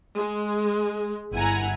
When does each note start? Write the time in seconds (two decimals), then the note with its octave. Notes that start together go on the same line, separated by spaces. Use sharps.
0.16 G#3
1.33 G1 E4 F#5 G#5 A#5 G#6